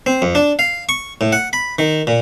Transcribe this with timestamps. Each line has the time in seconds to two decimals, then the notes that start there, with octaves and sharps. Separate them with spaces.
0.06 C4
0.22 F2
0.35 D4
0.59 F5
0.89 C#6
1.21 A2
1.32 F#5
1.53 B5
1.79 D#3
2.07 A#2